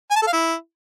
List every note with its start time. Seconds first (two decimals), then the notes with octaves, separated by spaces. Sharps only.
0.11 G#5
0.16 A5
0.22 A4
0.27 F5
0.33 E4